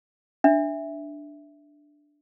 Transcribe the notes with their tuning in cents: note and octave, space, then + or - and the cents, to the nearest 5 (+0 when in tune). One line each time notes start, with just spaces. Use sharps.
D4 +0 E5 +0